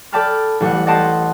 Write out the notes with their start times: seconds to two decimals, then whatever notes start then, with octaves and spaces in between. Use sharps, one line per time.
0.12 A4 D5 G5 A5 B5 F6
0.60 A1 G3 F#5
0.87 D5 D#5 F#5 G5 A5 C6